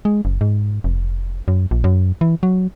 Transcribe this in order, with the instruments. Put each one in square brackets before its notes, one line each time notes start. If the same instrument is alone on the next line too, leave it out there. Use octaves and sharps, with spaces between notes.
[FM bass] G#3
F#1
G#2
F1
F#2
A#1
F#2
E3
F#3